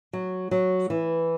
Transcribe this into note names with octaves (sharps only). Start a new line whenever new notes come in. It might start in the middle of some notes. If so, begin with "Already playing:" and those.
F#3
F#3
E3